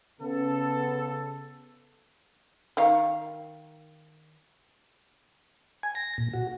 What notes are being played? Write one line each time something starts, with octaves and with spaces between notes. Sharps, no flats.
C#3 B3 A4
D#3 F5
G#5
A#6
A#2
F#4